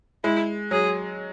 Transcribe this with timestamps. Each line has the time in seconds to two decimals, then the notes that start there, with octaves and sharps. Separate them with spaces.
0.24 G#3 E4
0.71 F#3 G#4